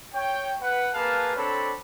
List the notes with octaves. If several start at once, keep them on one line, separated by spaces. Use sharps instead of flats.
C#5 G5
B4 F#5
A#3 G#4 B4 F5 A5
C4 D4 A4 C5 C#5 B5